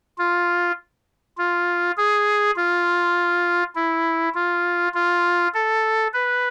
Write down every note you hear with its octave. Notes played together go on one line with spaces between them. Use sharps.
F4
F4
G#4
F4
E4
F4
F4
A4
B4